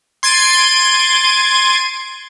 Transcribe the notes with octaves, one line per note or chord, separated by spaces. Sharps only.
C6 G#6 A6 D7 D#7